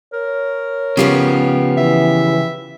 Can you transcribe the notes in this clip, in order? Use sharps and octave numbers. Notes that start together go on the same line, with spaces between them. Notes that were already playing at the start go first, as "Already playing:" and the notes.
A#4 C#5
C#3 F3 B3 C#4 F4 G4
E3 E5